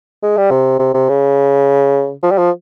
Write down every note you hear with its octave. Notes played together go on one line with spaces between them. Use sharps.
G#3
G3
C3
C3
C3
C#3
F3
G3
F3